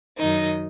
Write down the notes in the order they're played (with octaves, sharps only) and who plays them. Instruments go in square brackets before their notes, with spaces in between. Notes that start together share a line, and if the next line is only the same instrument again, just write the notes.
[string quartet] F#2 D#3 F#3 D#4 D#5